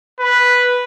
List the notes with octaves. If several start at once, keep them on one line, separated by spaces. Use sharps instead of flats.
B4